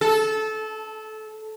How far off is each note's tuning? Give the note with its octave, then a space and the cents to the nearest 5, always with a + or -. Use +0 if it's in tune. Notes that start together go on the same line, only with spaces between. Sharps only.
A4 -20